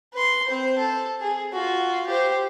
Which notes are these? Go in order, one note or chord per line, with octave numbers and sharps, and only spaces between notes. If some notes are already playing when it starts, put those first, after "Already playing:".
B4 C6
C4 C5
A4
G#4
F4 F#4
G4 C5